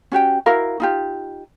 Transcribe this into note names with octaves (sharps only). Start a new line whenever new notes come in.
C#4 F#4 G4 G5
E4 F#4 A#4 F5
D#4 F4 G4